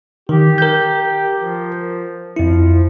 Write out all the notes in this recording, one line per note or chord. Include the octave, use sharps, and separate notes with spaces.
D#3 G4
A#4 G6
F3
F2 F3 E4